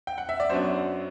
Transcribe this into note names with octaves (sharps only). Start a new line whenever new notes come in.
G5
F#5
E5
D5
F#2 F#3 B3 D4 C5